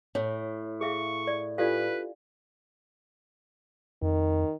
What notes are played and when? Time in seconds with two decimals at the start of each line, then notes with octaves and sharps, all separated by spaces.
0.15 A2 C#5
0.81 G#4 E5 F5 C#6
1.27 D5
1.58 D4 F4 G4 A4 B4 D5 F5
4.02 F2 D#3